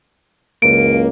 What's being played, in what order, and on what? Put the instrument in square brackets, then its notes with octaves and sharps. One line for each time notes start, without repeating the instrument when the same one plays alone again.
[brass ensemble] F#1 C#2 A#3 [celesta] D7